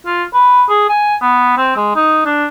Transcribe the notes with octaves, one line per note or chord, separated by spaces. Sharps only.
F4
B4
G#4
G#5
B3
C4
G#3
D#4
D4